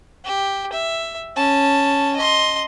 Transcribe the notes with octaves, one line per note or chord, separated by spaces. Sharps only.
G4
E5
C#4 A5
D#5 C6